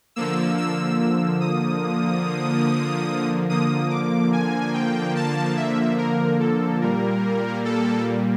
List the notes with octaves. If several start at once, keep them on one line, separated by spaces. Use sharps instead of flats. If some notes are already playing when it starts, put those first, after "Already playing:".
D3 F3 A#3 E6
E6
E6
D#6
D3 F3 A#3 D#6
D6
G#5
G5
A5
E5
A#4
A4
A#2 G3 A#3 A#4
A4